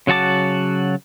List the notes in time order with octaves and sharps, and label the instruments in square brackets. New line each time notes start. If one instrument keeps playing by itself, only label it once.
[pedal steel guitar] C#3 F#3 F#4 A5 D6